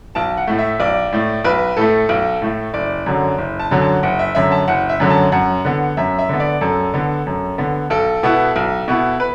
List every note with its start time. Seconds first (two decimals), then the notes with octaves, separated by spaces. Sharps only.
0.15 B1 A5
0.37 F#5
0.47 A2 A3
0.59 E5
0.80 B1 D5
1.12 A2 A3
1.44 B1 B4
1.77 A2 A3 A4
2.09 B1
2.42 A2 A3
2.74 F#1 D5
3.06 F#2 D3 F#3
3.38 F#1
3.59 A5
3.71 F#2 D3 F#3
3.82 A5
4.03 F#1 F#5
4.19 E5
4.35 F#2 D3 F#3 E5
4.52 A5
4.68 F#1 F#5
4.89 E5
5.00 F#2 D3 F#3
5.10 A5
5.32 F#2 F#5
5.65 D3 B3
5.97 F#2 E5
6.19 E5
6.29 D3 B3
6.40 D5
6.61 F#2 A4
6.94 D3 B3
7.27 F#2
7.58 D3 B3
7.90 B1 A4
8.23 B2 B3 E4
8.56 B1
8.88 B2 B3 E4
9.20 B4